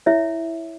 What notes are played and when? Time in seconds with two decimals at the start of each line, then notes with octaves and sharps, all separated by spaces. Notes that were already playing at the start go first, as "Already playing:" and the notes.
0.06 E4 C#5 E5